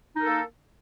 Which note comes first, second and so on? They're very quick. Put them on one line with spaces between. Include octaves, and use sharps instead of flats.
D#4 A#4 A4 A#3